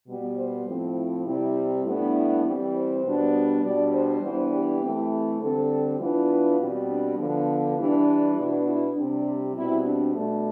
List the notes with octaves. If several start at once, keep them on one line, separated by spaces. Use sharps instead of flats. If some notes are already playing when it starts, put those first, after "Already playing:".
B2 G3 B3
C5
A2 F3 C4
E4
C3 G3 C4 E4
A2 G3 B3 D4 E4
E3 G3 C4
C5
B2 G3 B3 D4
B2 G3 D4 D5
C5
E3 G3 B3 D4
G4
E3 A3 C4
D3 G3 C4 A4
E3 B3 D4 F4
B2 G3 C4
D4
D3 F3 B3
E3 G3 D4
B2 B3 D4 E4
E4
C3 G3 C4 D4
B2 G3 C4 E4
D4
B2 A3 D4